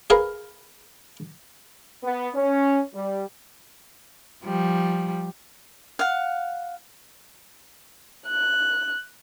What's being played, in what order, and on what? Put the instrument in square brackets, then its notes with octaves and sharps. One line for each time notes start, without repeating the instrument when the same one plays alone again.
[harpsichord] G#4 A#4 B4 F5
[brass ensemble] B3
C#4
G3
[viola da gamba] F3 G3
[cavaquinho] F5 F#5
[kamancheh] F#6